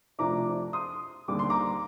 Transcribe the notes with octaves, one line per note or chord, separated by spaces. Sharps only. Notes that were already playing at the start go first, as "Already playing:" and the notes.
F2 C3 F3 A3 D4 A#5 D6
C6 D#6
D#2 D3 G3 C4 D6
C6
A#5 D6